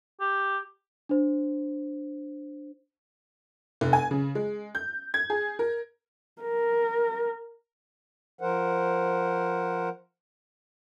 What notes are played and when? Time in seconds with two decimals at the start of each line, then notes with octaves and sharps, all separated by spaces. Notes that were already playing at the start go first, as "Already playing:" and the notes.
0.20 G4
1.09 D4 C5
3.81 F1
3.93 G#5
4.11 C#3
4.35 G#3
4.75 G6
5.14 G#6
5.30 G#4
5.59 A#4
6.42 A#4
8.41 F3 A#4 C5 F#5